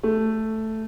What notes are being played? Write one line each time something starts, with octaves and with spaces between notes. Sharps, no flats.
A3